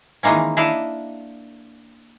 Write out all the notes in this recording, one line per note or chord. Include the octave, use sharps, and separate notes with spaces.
D#3 E3 G#3 A#3 C#4
D4 E4 D#5 F5